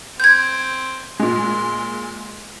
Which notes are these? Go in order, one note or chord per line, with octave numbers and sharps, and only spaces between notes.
C4 G6 G#6
A#2 G#3 C6